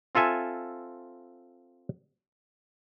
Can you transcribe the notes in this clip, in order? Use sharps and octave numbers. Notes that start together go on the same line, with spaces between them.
C4 F4 A4 E5 G#5